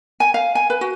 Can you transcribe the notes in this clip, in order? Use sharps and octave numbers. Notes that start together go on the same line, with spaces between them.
G#5
F5
G#5
B4
F#4